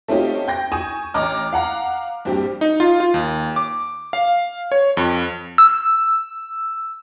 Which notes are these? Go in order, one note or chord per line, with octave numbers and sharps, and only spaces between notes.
A3 C4 C#4 D#4 F4 G4
G5 G6 A#6
G#5 C#6 D#6 E7
A1 D#5 A#5 D6 F6
F5 F#5 A#5
A#1 G2 C4 G4
D#4
F4
F4
D#2
D6
F5
C#5
F2
E6